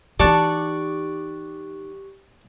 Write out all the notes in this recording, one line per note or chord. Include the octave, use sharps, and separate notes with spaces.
E3 D#4 G4 D5 A5 C#6 F#6